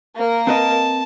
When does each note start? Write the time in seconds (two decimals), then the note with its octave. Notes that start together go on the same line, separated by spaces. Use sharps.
0.15 A#3 A#4
0.47 C4 B4 D#5 A5